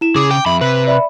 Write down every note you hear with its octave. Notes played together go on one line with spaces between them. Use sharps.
E4 E7
C#3 G#4 D6
G5
F2 E5 B5
C3 B4
D5 E5 B5